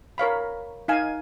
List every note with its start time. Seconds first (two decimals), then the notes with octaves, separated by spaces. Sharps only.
0.18 A#4 C#5 F5 B5
0.88 D#4 F5 G#5